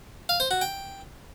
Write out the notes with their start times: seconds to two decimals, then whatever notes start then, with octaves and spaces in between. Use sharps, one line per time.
0.29 F5
0.40 C5
0.51 F#4
0.61 G5